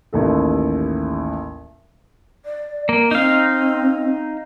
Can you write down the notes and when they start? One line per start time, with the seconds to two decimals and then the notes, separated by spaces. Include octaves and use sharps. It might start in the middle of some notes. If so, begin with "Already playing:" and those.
0.13 A1 D#2 A4
2.45 D5
2.89 A#3
3.11 C4 D#4 F5